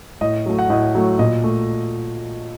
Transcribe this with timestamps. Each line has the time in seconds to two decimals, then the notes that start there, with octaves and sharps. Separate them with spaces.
0.21 A2 D#5
0.46 F#3 A3
0.59 F#5
0.70 A2 D#5
0.95 F#3 A3
1.19 A#2 D#5
1.43 A3